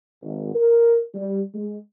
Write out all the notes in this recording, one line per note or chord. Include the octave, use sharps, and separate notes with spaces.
G#1
A#4
G3
G#3